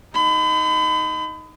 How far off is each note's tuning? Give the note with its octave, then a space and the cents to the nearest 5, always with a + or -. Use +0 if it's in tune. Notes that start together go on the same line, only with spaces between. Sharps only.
D#4 +5 B5 +40